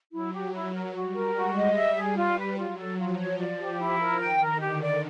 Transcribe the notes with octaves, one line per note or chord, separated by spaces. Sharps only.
F#3 E4
G4
E4
A#4
G3 F#4
A#4
G#3 F#4
D#5
G3 E5
G#4
F4
B4
F#3 F4
A4
F3 F4
C#5
D5
G4
E4
A#4
D#3 G5
A#4
D3 G4
D5